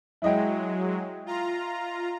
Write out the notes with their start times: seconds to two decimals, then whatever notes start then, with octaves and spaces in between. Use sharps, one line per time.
0.22 F#3 G#3 E4 D#5 G5
1.26 F4 A#5